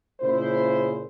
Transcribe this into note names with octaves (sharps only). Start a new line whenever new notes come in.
A#2 C#3 G#3 E4 C5